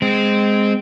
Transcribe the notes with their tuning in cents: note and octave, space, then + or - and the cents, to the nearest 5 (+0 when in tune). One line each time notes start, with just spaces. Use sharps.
G#3 -5 C4 -15